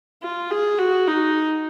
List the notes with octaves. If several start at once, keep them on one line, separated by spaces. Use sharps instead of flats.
F4
G#4
F#4
D#4